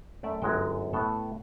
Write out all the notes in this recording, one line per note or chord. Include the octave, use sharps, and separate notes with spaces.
F#2 A3 D5 E5
G1 F#2 G#3 F#4 G5
A2 B3 A4